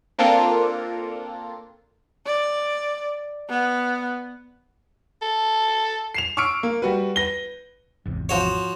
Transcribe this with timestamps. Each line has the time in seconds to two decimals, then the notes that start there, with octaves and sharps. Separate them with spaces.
0.19 A#3 C4 D4 F4 A4 A#4
2.26 D5
3.49 B3
5.22 A4
6.14 C7 E7 F7
6.37 C#6 D6 E6 F6 C#7 D7
6.63 A#3
6.82 G3 F#4 B4
7.16 B4 A#6 G7
8.06 G#1 E2 C3
8.29 F3 F#4 C#5